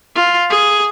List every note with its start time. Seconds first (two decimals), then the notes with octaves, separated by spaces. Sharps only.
0.15 F4
0.50 G#4